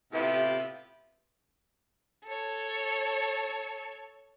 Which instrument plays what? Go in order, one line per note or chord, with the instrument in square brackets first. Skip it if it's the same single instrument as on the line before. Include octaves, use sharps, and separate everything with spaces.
[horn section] A2 C3 B3 E4 F4 G4
[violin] A4 C#5